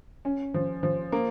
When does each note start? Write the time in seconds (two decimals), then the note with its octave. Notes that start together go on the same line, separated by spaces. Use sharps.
0.25 C#4
0.54 F3
0.83 F3
1.12 A#3